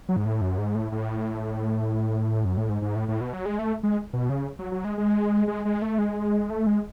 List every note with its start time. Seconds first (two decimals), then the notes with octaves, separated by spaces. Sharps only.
0.09 F#3
0.17 G#2
0.26 A2
0.41 F#2
0.58 G#2
0.75 A2
0.92 A2
2.45 F#2
2.57 A2
2.69 G#2
2.82 G#2
2.96 A2
3.08 A2
3.21 B2
3.33 F#3
3.45 G#3
3.59 A3
3.83 G#3
4.13 B2
4.29 C#3
4.59 F#3
4.72 F#3
4.84 G#3
4.98 G#3
5.48 G#3
5.65 G#3
5.82 A3
5.98 G#3
6.50 A3
6.67 G#3